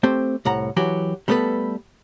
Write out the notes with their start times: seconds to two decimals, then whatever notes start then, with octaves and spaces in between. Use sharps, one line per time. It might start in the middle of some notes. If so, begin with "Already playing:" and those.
0.03 A3 C4 G4 C5
0.45 C2 A2 F#5 A#5
0.77 E3 F#3 F#4 G4
1.28 G3 A3 B3 G4 A4 B4